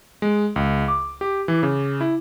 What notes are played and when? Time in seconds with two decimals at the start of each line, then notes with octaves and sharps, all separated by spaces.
0.22 G#3
0.56 C#2
0.88 D6
1.21 G4
1.48 E3
1.63 C#3
2.01 E4